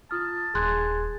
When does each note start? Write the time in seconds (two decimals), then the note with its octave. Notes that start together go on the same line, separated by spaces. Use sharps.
0.11 F4 A5 D#6 F6
0.55 D#1 G#4 C6 F#6 G#6